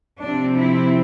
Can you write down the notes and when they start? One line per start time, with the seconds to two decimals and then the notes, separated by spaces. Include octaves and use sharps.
0.22 C3 F3 C4 D4
0.58 E4